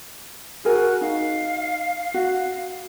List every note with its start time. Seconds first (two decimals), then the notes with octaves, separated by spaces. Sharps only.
0.65 F#4 G#4 A#4 G#5
1.01 D#4 F5
2.14 F#4